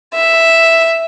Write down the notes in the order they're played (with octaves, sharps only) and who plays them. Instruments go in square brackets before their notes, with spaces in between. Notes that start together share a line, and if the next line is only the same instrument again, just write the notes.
[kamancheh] E5